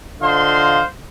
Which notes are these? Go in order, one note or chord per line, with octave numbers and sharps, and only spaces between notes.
D3 F4 C5 D#5 F5 C6